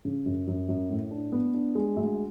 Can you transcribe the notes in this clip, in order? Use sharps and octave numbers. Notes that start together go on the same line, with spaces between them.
C#3
F#2
F#2
F#2
A2
D4
B3
D4
G#3
D2